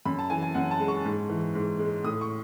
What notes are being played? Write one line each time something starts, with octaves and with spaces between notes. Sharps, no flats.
F#2 B5
A5
E3 G#5
G#5
F#2 F#5
A5
G#3
C#6
G#2
E3
G#2
G#3
A2 D#6
C#6